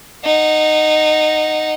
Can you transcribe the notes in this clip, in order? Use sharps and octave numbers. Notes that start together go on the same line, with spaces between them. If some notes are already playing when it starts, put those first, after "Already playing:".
D#4 F#5